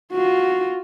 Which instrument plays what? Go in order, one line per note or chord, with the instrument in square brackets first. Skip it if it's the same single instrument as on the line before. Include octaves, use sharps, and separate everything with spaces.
[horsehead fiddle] F4 F#4